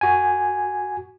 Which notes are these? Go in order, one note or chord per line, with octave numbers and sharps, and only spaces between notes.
F#4 G#5